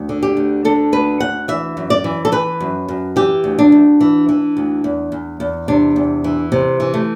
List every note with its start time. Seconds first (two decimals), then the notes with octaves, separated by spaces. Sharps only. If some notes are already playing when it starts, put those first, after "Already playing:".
Already playing: D2
0.09 D3
0.23 G4
0.37 D2
0.65 D3 A4
0.92 D2 B4
1.20 D2 F#5
1.48 E3 E5
1.77 F#2
1.90 D5
2.04 E3
2.25 A4
2.32 E3 B4
2.60 F#2
2.88 F#2
3.16 E3 G4
3.44 D2
3.59 D4
3.72 D2
4.01 E3
4.29 E3
4.57 D2
4.84 E2
5.12 E2
5.40 E2
5.68 C3 D4
5.96 E2
6.24 E3
6.52 C3 C4
6.80 E3
6.94 A3